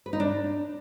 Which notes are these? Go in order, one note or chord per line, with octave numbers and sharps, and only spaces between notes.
B4
D#4
D4